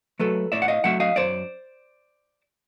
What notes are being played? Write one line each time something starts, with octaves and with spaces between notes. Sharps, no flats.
F#3 A3 A4 B4
A2 D5 E5
F#5
D#5 F5
F#3 A3 E5 F#5
D#5 F5
F#2 C5 D5